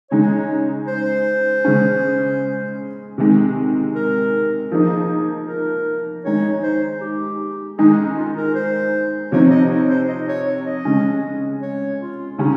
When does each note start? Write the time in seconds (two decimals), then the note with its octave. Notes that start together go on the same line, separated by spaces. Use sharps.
0.11 C#3 G#3 D#4 C#5
0.88 C5
1.65 C#3 G#3 C#4
3.18 C3 D#3 G#3
3.95 A#4
4.71 F3 A#3 D#4 G#4
5.48 A#4
6.25 D#3 G#3 D#4 C#5
6.63 C5
7.01 G4
7.78 D#3 G#3 D#4 G#4
7.98 C#4
8.17 F4
8.36 A#4
8.55 C5
9.32 C3 F3 C4 D#4 C#5
9.51 D#5
9.71 C#5
9.90 C5
10.08 D#5
10.28 C#5
10.47 C#5
10.66 D#5
10.85 C#3 G#3 C#4
11.62 C#5
12.00 F4
12.38 C#3 G3 C#4 D#4